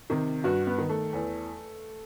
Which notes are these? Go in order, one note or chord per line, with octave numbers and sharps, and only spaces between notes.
C3 D#3
G2 F#4
B3
D#3
A3
E2